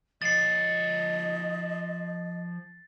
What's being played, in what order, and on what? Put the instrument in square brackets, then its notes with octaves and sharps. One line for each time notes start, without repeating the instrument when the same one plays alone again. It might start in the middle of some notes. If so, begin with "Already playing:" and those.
[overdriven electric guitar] F3 C#5 [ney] D#5 [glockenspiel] A6 C7